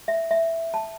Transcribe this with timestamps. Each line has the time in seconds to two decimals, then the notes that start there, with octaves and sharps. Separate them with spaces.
0.08 E5
0.31 E5
0.74 A5